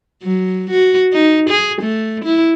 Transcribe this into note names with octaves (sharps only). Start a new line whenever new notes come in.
F#3
F#4
D#4
G#4
A3
E4